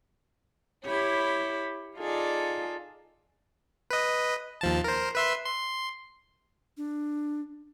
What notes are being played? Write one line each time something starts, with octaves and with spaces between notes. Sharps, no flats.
E4 G4 C#5 B5
D#4 F4 G#4 A4 D5
B4 D#5
D#2 F3 A5
A#4 C5
B4 E5 C6
C6
D4